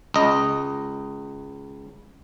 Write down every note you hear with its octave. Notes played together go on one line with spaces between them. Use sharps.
C#2 D#5